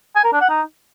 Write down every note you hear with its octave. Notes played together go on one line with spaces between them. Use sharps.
G#5
A#4
D4
F#5
D#4